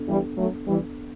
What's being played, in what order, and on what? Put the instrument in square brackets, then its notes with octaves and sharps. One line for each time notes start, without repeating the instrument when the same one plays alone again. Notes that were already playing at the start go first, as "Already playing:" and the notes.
Already playing: [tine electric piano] B3 D4 A4
[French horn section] E3 G3
F#3 A3
E3 G3